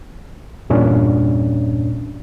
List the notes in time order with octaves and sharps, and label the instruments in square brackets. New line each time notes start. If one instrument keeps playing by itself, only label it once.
[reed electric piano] E2 G2 A#2 C#4 D4